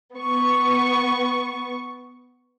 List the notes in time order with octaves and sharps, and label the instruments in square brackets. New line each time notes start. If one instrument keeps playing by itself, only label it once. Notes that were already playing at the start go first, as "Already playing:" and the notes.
[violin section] B3 C#6